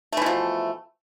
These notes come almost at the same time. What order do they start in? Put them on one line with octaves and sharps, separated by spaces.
A3 E3 B2 F3